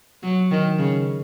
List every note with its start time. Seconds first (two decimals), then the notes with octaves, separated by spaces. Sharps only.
0.23 F#3
0.51 D#3
0.79 C#3